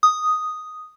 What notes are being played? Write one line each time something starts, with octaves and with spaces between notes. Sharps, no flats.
D#6